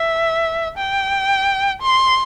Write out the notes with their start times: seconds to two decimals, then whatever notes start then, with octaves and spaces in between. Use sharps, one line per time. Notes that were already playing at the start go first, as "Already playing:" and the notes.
Already playing: E5
0.78 G5
1.82 C6